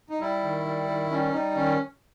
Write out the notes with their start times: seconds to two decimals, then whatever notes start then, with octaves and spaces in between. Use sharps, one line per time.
0.09 D#4
0.20 G3 E4
0.43 D#3
0.65 G3
0.88 D#3
1.10 G3 C#4
1.32 G3 D#4
1.55 D#3 C#4